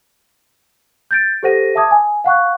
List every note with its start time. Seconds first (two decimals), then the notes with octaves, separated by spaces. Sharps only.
1.11 G6 A6 D7
1.43 G4 A4 C5 F#5 A#6 D#7
1.75 E5 A5 D6 D#6 G#6
1.91 G#5
2.24 F5 F#5 C#6 F#6